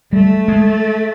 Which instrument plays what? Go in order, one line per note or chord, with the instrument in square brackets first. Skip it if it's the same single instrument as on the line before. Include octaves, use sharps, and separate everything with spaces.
[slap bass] G3 [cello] A3
[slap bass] G#3